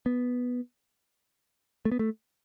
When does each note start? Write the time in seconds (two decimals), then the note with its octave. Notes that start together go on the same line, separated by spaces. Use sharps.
0.06 B3
1.85 A3
1.92 B3
1.99 A3